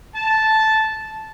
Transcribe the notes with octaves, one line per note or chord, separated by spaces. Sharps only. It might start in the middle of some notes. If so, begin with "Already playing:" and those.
A5